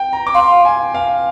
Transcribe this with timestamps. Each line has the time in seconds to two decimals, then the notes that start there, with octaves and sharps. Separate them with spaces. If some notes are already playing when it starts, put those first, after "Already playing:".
Already playing: G5
0.13 A#5
0.27 D6
0.35 F5 C6
0.65 G#5
0.94 F5